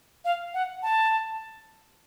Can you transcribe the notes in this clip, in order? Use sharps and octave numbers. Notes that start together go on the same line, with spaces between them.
F5
F#5
A5